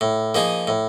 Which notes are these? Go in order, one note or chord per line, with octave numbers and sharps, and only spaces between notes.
A2
F3 A#3 D#4 G#4
A2